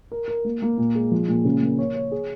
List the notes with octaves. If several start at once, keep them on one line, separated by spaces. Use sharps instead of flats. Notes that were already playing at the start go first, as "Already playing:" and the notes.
A#4
A#4
A#3
A#3
A#2
G#3
F3
A#2
C#3
A#3
C#5
C#5
G#4